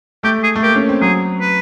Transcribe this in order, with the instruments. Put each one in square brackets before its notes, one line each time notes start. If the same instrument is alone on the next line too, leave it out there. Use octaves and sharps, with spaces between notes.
[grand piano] A3 [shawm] G4
[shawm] G#4
[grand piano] A3
[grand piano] A#3 [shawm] G4
[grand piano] C#4
C4
[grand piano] F#3 [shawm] G#4
[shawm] B4